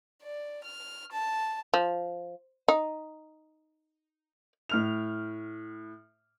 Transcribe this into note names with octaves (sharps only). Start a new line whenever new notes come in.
D5
F6
A5
F3
D#4
A2 F6 F7